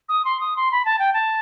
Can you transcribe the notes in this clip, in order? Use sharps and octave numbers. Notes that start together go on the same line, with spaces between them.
D#6
C6
D#6
C6
B5
A5
G5
A5